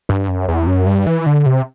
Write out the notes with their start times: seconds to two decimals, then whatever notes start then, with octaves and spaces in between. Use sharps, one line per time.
0.09 G2
0.28 F#2
0.48 E2
0.67 F#2
0.87 G2
1.07 E3
1.26 D3
1.46 C3